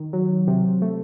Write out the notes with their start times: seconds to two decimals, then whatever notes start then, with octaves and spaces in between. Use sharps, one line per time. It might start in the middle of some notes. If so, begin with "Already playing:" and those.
Already playing: D#3
0.13 F#3
0.47 C3
0.82 A3